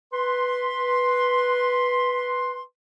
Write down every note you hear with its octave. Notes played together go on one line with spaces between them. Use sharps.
B4 C6